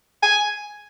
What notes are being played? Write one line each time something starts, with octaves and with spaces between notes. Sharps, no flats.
G#5